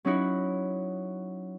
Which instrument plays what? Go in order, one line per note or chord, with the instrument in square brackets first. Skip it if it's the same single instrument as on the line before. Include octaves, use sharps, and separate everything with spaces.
[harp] F#3 C#4 D#4 E4 F#4